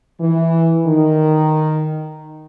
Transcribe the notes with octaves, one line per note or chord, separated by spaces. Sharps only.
E3
D#3